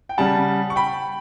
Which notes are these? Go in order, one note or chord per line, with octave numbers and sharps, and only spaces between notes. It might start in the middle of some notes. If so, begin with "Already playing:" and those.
G5
C#3 G3 F#5 A5
C#6
G5 B5